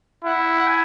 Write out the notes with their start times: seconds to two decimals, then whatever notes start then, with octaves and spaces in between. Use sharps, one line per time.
0.25 E4 F#5
0.59 F#5
0.67 G#5